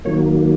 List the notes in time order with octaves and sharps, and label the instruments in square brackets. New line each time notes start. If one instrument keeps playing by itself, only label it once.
[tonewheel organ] D#3 F#3 A#3 C#5